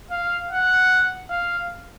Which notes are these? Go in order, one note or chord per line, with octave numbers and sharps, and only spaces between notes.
F5
F#5
F5